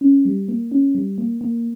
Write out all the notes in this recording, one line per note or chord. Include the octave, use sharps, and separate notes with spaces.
C#4
G3
A#3
C#4
G3
A#3
A#3